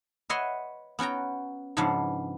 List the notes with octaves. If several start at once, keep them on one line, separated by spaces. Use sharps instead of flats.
B4 C#5 D#5 E5 F#5 C6
B3 C#4 F#4 G5 A#5
G#2 C#3 F3 B3 D4